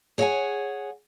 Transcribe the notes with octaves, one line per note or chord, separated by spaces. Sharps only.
G#4 C#5 D#5 E5 F#5 G#5